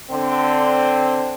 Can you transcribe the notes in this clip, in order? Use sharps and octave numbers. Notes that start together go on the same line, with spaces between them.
D3 C4